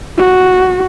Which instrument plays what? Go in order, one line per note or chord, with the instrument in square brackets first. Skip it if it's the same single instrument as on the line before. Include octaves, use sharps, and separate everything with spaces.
[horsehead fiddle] F#4